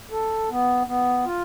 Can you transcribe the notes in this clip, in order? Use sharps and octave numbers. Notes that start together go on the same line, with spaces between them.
A4
B3
B3
F4